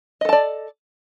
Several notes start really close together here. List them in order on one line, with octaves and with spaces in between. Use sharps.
D#5 A4 A5 D5